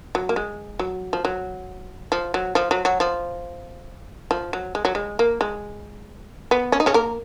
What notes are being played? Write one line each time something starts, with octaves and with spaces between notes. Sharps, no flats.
F#3
A#3
G#3
F#3
F3
F#3
F3
F#3
F3
F#3
F#3
F3
F3
F#3
G#3
F#3
G#3
A#3
G#3
B3
C#4
D#4
C#3 C#4
A#3 A#4